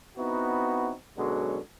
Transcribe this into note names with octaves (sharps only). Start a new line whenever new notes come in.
B3 C4 D#4 E4 F#4
F#2 B2 D3 F#3 G#3